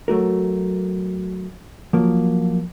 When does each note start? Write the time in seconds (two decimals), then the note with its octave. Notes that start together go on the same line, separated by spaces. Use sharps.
0.08 F#3 A3 F#4 A#4
1.93 F3 F#3 A#3